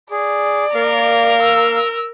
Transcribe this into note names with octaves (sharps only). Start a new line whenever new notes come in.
G#4 D5
A#3 A#4 F5
E6